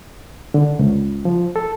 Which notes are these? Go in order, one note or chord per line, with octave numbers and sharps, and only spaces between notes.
D3
C#2
F3
A4